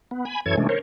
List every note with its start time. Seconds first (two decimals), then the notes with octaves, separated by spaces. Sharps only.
0.11 B3
0.25 G#5 B5
0.46 F#2 E3 A4 C#5 G#6
0.58 C3 E3 G#3 A3 C#4 D4
0.69 A#4 C5 C#5